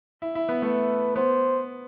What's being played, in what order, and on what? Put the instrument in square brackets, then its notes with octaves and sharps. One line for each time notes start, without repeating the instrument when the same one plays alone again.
[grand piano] E4
E4
B3
[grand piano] A3 [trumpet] B4
[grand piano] B3 [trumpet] C5